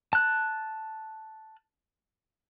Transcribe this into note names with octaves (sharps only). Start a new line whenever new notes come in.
A5 F#6